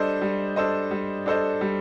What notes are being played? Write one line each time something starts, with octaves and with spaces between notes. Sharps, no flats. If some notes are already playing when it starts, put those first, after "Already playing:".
Already playing: G3 D4 A4 C5 D#5
G3
D4 A4 C5 D#5
G3
D4 A4 C5 D#5
G3